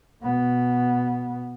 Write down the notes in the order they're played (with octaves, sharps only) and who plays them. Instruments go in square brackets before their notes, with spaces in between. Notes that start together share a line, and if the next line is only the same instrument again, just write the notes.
[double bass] B2 B3